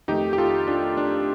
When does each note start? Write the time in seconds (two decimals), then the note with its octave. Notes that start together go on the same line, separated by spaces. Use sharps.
0.08 F2 D#3 A3 D#4 G4
0.33 G4
0.38 F4 A4
0.67 D4 F4
0.97 D4